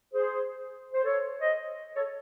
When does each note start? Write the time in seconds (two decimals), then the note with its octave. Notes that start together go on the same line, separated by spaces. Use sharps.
0.12 G#4 C5
0.93 C5
1.03 A4 C#5
1.40 C5 D#5
1.95 A4 C#5